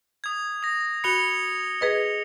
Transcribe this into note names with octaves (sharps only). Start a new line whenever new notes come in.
D#6 G#6
D#6 A#6
F#4 B5 C#7 F7 G7
G#4 B4 D#5